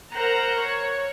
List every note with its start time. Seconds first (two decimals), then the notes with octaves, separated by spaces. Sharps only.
0.14 A#4 C5 F#5 A#5
0.57 C#5